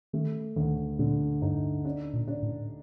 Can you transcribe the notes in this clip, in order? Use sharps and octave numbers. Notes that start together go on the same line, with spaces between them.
D#3 A3
D2 D#3
A#2 D3
G2 D#4
D4
A#2
D4
A2